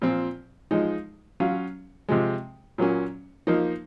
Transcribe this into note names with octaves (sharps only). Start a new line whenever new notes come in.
A#2 F3 C4
F3 G#3 D#4
F#3 C#4 F4
C3 F3 G#3
A#2 F#3 A#3 C#4
F3 A#3 D#4